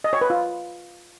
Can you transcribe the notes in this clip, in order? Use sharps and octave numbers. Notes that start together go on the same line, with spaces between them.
D#5
C#5
B4
F4